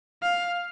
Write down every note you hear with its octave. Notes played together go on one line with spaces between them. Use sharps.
F5